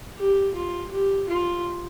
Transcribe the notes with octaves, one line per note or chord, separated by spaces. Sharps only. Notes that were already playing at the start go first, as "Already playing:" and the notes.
G4
F4
G4
F4